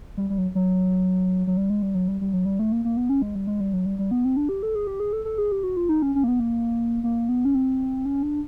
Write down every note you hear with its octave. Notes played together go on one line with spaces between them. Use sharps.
G3
G3
F#3
F#3
F#3
G3
G#3
G3
F#3
G3
G3
F#3
G3
A3
A#3
A#3
B3
C#4
G#3
G3
G#3
G3
F#3
G3
G3
B3
C4
D4
G4
A4
G#4
G4
G#4
A4
A4
G#4
G4
F#4
F4
D#4
C#4
C#4
A#3
B3
A#3
A#3
B3
C#4
C4
C#4
D4